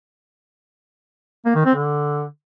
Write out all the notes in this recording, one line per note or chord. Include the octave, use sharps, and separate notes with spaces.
A#3
D#3
C4
D3